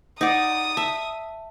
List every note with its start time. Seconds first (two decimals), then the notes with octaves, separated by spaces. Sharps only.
0.21 D#4 D5 D#5 F#5 D6 D#6
0.77 E5 A5